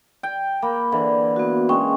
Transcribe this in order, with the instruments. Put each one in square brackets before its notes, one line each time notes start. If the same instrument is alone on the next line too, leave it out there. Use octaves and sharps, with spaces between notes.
[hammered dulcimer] G5
[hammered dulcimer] A#3 [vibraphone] B5
[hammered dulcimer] D3 E3
[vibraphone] B3 F#4
[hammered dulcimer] G#3 [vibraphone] C#4 G5 C#6